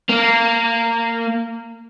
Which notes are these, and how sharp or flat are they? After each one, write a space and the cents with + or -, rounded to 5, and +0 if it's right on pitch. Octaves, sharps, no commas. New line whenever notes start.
A#3 -20